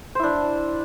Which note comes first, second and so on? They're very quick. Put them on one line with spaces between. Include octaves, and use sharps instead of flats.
C5 E4 D4